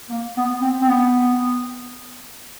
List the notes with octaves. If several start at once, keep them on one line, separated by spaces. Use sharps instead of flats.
A#3
B3
C4
C4
B3